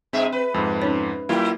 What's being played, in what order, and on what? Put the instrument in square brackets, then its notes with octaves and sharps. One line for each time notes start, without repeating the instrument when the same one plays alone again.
[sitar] G2 G#4 E5 [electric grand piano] C4
[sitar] B4
[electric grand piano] F2 G#2 [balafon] G#3
[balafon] C#4 D#4 C#5
[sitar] F#3 [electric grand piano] A#3 E4 F4